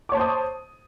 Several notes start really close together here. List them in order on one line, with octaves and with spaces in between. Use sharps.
D6 C#5 A5 C5 D#6